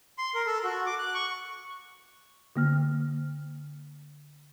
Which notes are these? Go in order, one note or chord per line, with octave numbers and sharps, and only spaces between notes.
C6
A#4
A4
F#4
D6
F#6
C#6
D3 A#3 F6